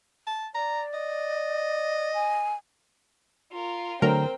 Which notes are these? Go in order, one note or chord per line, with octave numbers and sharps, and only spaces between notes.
A5
D5 A#5
D#5
G#5
F4 A#4
D3 F#3 A3 C4 A#4 G5 A#5